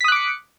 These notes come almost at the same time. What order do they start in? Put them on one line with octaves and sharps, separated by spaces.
B6 D#6 F#6 D6 C#7